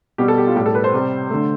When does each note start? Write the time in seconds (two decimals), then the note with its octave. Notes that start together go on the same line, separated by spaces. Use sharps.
0.18 B2 G3 G4
0.28 A4
0.38 G4
0.47 F4
0.56 A2 G3 G4
0.66 A4
0.75 B4
0.84 C5
0.94 C3 G3
1.30 D3 A3